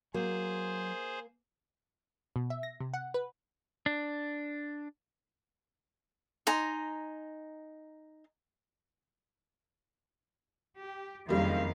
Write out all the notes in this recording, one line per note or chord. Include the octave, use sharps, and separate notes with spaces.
F#3 A#3 G#4 C5
B2
E5
A#6
C3
F#5
B4
D4
D#4 G#5 A#5 C6
G4
F#1 F2 D#3 G3 F5